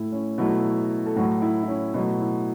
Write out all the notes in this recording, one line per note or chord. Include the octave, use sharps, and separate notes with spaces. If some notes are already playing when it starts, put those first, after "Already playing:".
Already playing: A2 A3 E4
C#4
B2 F#3 A3 E4
A4
A2 F#3 A3 F#4
E4
E4
C#4
B2 F#3 A3 E4
E4